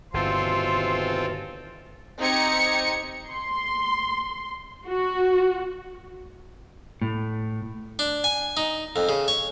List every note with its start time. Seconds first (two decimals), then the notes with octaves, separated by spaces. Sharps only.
0.14 G1 D#2 B2 E3 C4 F4 A4 C6
2.19 C4 D#4 G4 A#5 G#6 C#7
3.30 C6
4.86 F#4
7.02 A2
7.99 D4
8.24 G#5
8.57 D#4
8.96 F2
9.09 C#3
9.28 C#5